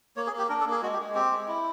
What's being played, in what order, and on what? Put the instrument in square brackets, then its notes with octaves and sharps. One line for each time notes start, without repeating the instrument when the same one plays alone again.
[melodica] A#3 C#5
G#4
A#3
G4
D4 A#4
A4
A#3
G#4
G#3 F#4
G4
G#3
C4 G4
G#3
E4